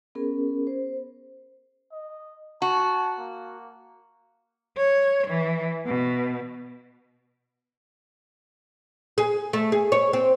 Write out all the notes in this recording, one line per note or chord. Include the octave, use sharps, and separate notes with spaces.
B3 C#4 G#4 A#4
C5
D#5
F#4 A5
A#3
C#5
E3
B2
G#4
A3
G#4
C#5
C4